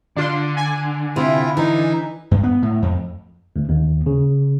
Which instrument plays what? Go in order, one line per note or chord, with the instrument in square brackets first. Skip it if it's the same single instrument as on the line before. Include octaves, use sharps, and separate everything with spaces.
[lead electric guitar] D3 [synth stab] D4 F4 C6
[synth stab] G#5
[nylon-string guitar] C3 [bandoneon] E4 F4
[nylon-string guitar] E3 [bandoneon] D#4
[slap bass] G2
B3
A2
F2
[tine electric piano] D2
D#2
C#3